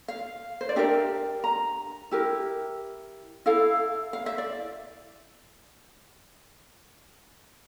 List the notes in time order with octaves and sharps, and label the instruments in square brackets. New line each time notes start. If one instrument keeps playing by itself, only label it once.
[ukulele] F5
C5
D5
D4 G4 A#4 E5
A#5
E4 G4 A#4
E4 A4 F5
F5
E5
D5